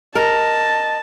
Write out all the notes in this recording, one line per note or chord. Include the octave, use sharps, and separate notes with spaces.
A#4 D#5 A5